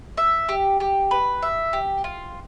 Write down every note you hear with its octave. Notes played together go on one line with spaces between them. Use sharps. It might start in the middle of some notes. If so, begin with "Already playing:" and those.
E5
G4
G4
B4
E5
G4
F4